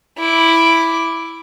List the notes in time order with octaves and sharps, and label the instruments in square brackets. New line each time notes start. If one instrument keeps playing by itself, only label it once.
[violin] E4 D6